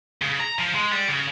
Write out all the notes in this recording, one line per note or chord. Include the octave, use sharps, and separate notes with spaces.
C#3
A#5
F3
G#3
G3
C#3